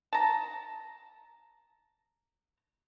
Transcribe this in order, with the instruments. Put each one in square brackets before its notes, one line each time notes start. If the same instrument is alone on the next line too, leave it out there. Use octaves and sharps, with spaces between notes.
[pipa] A5 A#5